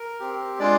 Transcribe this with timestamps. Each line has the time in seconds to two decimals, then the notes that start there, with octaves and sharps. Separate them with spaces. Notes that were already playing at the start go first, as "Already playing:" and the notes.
Already playing: A#4
0.20 C4 G4
0.60 G#3 D4 F4 D5